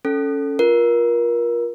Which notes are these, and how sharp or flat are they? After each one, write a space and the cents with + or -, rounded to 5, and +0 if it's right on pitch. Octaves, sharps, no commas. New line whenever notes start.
C#4 +0 A4 +0
F4 +0 A#4 +25